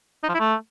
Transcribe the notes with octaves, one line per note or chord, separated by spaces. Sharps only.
D#4
F3
E4
A3